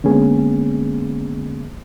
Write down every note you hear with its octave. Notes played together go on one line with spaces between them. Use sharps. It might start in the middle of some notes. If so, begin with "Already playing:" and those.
D3 G#3 A#3 B3 C#4 G#4